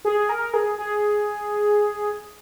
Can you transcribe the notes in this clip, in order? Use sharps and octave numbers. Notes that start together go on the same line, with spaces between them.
G#4
A#4
G#4
G#4